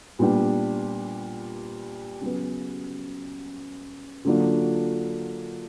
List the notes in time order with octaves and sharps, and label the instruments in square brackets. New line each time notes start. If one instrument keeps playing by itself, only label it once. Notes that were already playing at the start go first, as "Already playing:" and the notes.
[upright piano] A#2 G3 B3 D4 G4
C#3 F#3 B3
D3 F#3 A#3 D4 F4